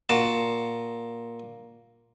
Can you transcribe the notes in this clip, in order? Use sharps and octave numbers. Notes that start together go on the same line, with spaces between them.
A#2 F#4 A5